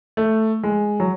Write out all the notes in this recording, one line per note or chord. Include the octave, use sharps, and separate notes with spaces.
A3
G#3
F#3